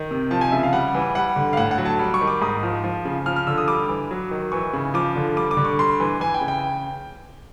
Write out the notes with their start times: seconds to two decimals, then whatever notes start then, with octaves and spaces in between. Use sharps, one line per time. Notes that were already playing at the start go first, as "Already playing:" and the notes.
Already playing: D#3
0.11 C3
0.31 F3 A5
0.41 G#5
0.52 C#3 E5
0.63 F5
0.73 G3 F#5
0.94 E3
1.15 G3 F#5
1.36 D3
1.53 F5
1.57 A2 F#5
1.71 F#5
1.78 F#3
1.86 A5
1.99 G3
2.14 C#6
2.21 D#3
2.27 D6
2.42 G#2 D#6
2.63 F3
2.84 F3
3.05 C#3
3.26 F3 F6
3.36 F6
3.47 D3 E6
3.58 D#6
3.68 G3 D6
3.89 E3
4.11 F#3
4.31 D#3
4.52 E3 C#6
4.73 C#3
4.94 F3 D6
5.16 D3
5.36 G3 D6
5.51 D6
5.57 D3
5.65 C#6
5.79 G3 C6
6.00 E3
6.20 E3 G#5
6.34 G5
6.41 C#3
6.48 G5